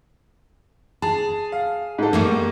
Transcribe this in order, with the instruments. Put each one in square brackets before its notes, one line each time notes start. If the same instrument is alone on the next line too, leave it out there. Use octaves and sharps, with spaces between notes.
[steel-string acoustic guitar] G#4 [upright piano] A5
[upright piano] F5
G#2 G#3 A4
[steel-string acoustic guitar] G3 A3 A#3